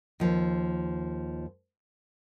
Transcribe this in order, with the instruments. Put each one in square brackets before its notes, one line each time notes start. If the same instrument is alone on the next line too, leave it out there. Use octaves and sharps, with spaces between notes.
[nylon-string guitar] D#2 F3